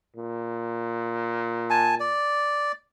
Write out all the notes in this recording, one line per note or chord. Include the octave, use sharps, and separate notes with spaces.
A#2
G#5 A5
D5